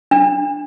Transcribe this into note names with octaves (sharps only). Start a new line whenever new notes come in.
D4